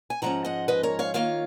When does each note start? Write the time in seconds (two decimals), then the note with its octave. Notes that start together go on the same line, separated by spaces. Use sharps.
0.10 G#5
0.22 G#2 F3 G#3 C#4 F#5 A#5
0.45 D#5 F#5
0.68 B4 D#5
0.83 A#4 C#5
0.99 C#5 F5
1.14 D#3 A#3 F4 C#5 F5